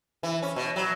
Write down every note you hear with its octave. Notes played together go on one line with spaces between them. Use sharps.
E3
C#4
B2
F#3